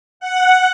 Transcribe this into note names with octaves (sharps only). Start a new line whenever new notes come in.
F#5